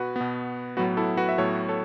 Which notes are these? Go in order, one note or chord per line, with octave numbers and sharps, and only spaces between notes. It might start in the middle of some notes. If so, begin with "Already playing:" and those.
Already playing: B2 B3 F#4 B4
B2 B3
A2 F#3 B3 F#4 B4
E4 A4
F#4 B4
E5
A2 F#3 B3 A4 C#5
A4 C#5